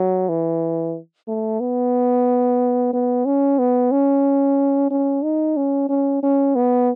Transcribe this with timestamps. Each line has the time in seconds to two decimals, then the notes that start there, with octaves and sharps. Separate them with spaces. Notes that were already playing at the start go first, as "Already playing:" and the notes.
Already playing: F#3
0.29 E3
1.28 A3
1.61 B3
2.93 B3
3.26 C#4
3.59 B3
3.92 C#4
4.91 C#4
5.24 D#4
5.57 C#4
5.89 C#4
6.23 C#4
6.56 B3